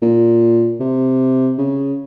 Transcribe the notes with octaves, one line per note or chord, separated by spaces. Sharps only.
A#2
C3
C#3